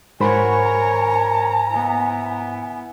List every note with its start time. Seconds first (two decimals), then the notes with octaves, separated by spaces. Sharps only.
0.20 G#2 F#4 A#4 C5 C#5 G#5 B5
0.63 A#5
1.70 B3 E4